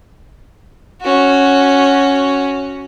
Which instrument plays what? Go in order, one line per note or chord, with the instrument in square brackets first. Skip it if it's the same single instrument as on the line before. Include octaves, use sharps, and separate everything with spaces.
[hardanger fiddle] C#4 F#4